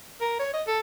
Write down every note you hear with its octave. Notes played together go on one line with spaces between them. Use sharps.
A#4
C#5
D#5
A4